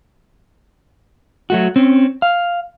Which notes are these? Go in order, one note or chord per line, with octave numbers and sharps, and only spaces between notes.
F#3 A3 F#4
C4 C#4
F5